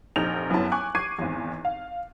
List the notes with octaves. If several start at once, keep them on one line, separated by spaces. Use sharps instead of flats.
F1 A#1 D#4 F6 G6 F7
F#1 F#2 F#3 B3 E4 A5
G#5 C#6 D6 F#6
C#6 D6 G#6 C7 D#7
G#1 E2
F5